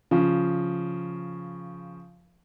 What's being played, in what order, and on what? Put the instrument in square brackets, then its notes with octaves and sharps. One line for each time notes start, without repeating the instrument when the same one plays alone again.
[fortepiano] C#3 F3